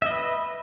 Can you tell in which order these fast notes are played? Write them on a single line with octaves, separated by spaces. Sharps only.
E5 D#5 B4